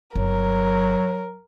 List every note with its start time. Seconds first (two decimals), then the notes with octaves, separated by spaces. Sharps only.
0.16 G1 F#3 A#4